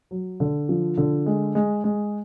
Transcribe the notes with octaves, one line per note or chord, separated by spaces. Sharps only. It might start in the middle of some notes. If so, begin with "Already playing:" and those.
F#3
D3
F3
D3
G#3
G#3
G#3